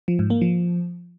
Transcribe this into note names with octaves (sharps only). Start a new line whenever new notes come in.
F3
G#2
A#3
F3